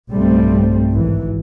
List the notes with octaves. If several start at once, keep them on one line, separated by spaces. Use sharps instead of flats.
B1 G2 G3 A3 C4
G#1 E3